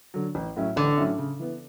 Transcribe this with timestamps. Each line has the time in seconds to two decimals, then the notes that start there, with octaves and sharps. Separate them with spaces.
0.14 D3 F#3
0.35 A1
0.57 A2 F#3 C#4 E4
0.76 A1 D3
0.98 A2 F#3 C#4 E4
1.18 C#3
1.39 E3 B3